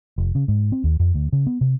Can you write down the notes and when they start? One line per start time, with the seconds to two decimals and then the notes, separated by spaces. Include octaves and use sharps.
0.18 F1
0.35 C#3
0.48 G#2
0.72 C4
0.84 D#2
0.99 F2
1.14 D2
1.33 C#3
1.47 B3
1.61 C3